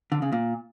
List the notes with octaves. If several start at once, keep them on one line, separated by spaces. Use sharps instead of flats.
D3
C#3
A#2